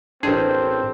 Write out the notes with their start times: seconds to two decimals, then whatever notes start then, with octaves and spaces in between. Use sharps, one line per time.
0.23 A1 C4 D4 G#4 A#4 C5 A5